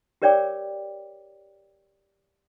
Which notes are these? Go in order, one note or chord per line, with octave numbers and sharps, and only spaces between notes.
G4 A#4 C#5 D5 G5 D6